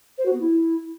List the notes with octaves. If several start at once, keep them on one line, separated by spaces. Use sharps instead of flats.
C5
F#4
B3
E4